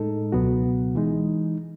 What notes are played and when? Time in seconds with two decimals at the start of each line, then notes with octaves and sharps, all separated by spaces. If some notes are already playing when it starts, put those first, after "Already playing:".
Already playing: A2 G#3 D#4 A4
0.32 C#2 B2 F#3 B3 F#4
0.95 E3 G#3 D#4